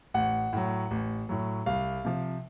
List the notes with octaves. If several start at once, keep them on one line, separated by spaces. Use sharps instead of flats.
A1 F#5
A2 F#3
A1
A2 F#3
C2 F5
C3 F3